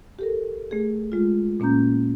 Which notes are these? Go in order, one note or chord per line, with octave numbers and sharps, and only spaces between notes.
G4 A4 A#4
A3 G#4
G#3 F4
A#2 A#3 C#4 A#5 G6